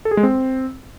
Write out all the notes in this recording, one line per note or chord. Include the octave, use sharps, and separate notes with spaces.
A4
G#4
G#3
C4